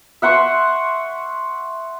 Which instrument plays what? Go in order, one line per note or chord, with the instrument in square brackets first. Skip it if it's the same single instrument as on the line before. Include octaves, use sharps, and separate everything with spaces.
[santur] E5 F#5 C6 C#6